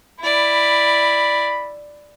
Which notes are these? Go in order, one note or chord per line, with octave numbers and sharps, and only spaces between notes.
E4 D5 B5